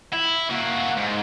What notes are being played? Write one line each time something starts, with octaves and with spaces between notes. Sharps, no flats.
E4
A#3 F#4
G#2